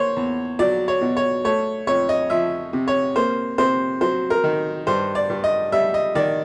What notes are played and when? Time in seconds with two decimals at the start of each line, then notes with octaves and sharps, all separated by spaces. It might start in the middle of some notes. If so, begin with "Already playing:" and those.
Already playing: A#3 C5 C#5
0.17 E2
0.59 F#3 D5
0.88 C#5
1.01 B2
1.17 C#5
1.45 A3 C#5
1.87 F2 C#5
2.09 D#5
2.30 F3 E5
2.73 C3
2.88 C#5
3.15 A#3 C5
3.58 C3 C5
4.01 F#3 C5
4.30 A#4
4.44 D#3
4.87 G2 C5
5.15 D5
5.30 G2
5.44 D#5
5.72 G3 E5
5.94 D#5
6.15 D#3 D5